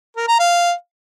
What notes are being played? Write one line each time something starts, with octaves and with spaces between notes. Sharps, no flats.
A#4
A#5
F5